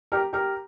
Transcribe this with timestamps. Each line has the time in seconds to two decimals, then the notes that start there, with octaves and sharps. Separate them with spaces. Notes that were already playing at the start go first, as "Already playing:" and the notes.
0.12 G4 A#4
0.33 G4 A#4